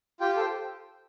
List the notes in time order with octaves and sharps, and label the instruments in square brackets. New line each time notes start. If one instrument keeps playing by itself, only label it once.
[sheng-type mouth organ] F4 G4 G5
A4
C5